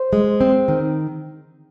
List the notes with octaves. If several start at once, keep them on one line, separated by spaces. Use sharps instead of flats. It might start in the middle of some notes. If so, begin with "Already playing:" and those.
Already playing: C5
G#3
C4
D#3